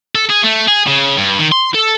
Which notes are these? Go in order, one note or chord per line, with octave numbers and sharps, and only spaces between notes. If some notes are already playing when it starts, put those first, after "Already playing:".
A4
G#4
A3
G#4
C#3
G2
D#3
C6
A4